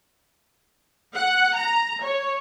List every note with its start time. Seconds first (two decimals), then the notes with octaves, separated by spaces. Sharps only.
1.14 F#5
1.54 A#5
2.01 C#5